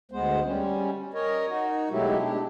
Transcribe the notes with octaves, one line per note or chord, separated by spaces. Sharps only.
D2 G#3 B3 C5
G3 C#4
A#4 C#5 D#5
D#4 F#4
B2 F#3 G#3 A3 E4 G4
D4 G4